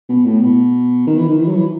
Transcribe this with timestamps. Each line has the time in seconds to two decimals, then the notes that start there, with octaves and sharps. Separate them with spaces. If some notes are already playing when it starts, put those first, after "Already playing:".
0.09 B2
0.25 A2
0.41 B2
1.07 D#3
1.18 E3
1.29 D#3
1.41 E3
1.48 F#3
1.56 E3